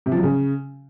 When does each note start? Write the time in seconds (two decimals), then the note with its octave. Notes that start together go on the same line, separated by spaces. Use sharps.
0.06 C3
0.12 F3
0.17 F#3
0.23 C#3